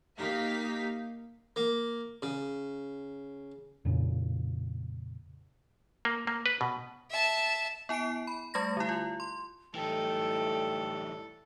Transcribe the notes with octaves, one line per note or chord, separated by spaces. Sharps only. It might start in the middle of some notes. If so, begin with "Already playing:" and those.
A#3 D#4 G4 F5 B6
A#3
C#3
F2 A#2 C#3
A#3
A#3
B4
B2
E5 A5
B3 E4 G#5 C7 D7
B5
G3 A3 C#6 G#6 A#6
D3 E4
F4
C6
A2 E3 G3 A3 D#4 A4 G5